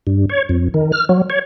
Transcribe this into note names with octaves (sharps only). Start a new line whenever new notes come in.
G2
C#5
F2
D#3
F6
F#3
C#5